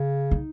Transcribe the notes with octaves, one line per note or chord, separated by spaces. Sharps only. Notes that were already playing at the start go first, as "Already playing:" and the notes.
Already playing: C#3
D#4